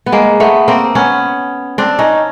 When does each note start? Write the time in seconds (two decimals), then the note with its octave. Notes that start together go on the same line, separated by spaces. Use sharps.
0.06 B3
0.12 G#3 A#3
0.40 A3 B3
0.68 A#3 C4
0.95 B3 C#4
1.78 C4 D4
1.99 C#4 D#4